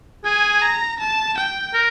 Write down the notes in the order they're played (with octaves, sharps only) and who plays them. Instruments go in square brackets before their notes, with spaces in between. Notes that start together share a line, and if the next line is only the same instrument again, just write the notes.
[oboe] G#4 [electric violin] G#5
[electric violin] A#5
A5
G5
[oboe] A#4